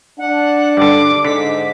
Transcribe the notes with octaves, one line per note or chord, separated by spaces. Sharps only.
D4 F#5
G2 D3 D6
G#2 D3 B6